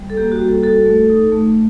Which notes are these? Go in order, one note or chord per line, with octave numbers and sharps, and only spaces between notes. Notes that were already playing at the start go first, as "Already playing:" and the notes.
Already playing: G3
A4
A#3 G4
F#4
G3
A4
F#4 A4
A3
D#4
A3